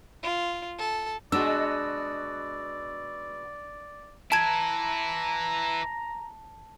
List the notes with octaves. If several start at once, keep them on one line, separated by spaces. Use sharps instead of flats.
F4
A4
B2 G#3 D4 F#4 D5 E6
E3 E4 A5 A#5 G#6 D7 E7